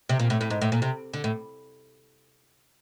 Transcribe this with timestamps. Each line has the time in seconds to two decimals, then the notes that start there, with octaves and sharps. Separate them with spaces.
0.09 C3
0.19 A#2
0.30 A2
0.41 A2
0.50 G#2
0.62 A2
0.72 A#2
0.82 C3
1.14 D3
1.24 A2